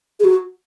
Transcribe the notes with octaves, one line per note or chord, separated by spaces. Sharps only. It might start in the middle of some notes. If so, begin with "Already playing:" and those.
G#4
F#4